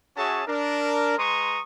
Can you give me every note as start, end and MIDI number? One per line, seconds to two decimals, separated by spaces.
0.16 0.42 61
0.16 0.42 66
0.16 0.42 68
0.16 0.42 73
0.16 0.42 76
0.16 0.42 81
0.47 1.15 62
0.47 1.15 70
1.18 1.61 56
1.18 1.61 71
1.18 1.61 82
1.18 1.61 84
1.18 1.61 85
1.18 1.61 87